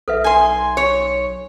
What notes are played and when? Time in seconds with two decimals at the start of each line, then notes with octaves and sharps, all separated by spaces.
0.08 B1 A4 B4 E5
0.24 G#5 C6
0.77 C#5